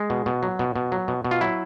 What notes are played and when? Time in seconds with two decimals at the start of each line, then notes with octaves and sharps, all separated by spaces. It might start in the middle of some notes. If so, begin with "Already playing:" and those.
Already playing: G#3
0.10 B2
0.26 B2
0.43 F#3
0.59 B2
0.76 B2
0.92 F#3
1.08 B2
1.25 B2
1.31 F4
1.41 F#3 E4